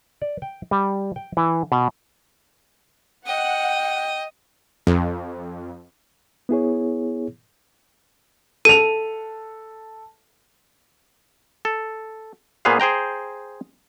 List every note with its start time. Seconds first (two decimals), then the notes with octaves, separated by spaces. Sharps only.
0.22 D5
0.42 G5
0.71 G3
1.16 G5
1.37 E3
1.72 B2
3.27 D#5 F#5 G5
4.87 F2
6.49 B3 E4 G#4 C#5
8.65 A4 D#7 F7
11.65 A4
12.65 A#2 B3 G#4 B4 C5 F5
12.80 G#4 C5 G5 A#5